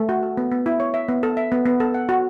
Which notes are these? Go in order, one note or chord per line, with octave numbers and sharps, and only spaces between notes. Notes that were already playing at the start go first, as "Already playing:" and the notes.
Already playing: A3
F#4
A4
B3
B3
E4
C#5
E5
B3
A4
E5
B3
B3
A4
F#5
F#4